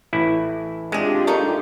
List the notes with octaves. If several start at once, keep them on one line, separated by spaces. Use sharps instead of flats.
A1 E4
C3 G#3 D4 F4 G4 G#4
A3 A#3 D#4